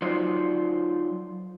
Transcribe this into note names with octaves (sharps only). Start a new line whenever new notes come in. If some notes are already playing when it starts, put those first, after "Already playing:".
F#3 D#4 F4 C5 D5